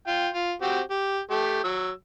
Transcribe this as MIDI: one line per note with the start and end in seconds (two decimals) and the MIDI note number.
0.07 0.28 65
0.07 0.28 79
0.33 0.52 65
0.62 0.80 60
0.62 0.80 66
0.62 0.80 67
0.91 1.19 67
1.31 1.60 57
1.31 1.60 67
1.64 1.90 54
1.64 1.90 88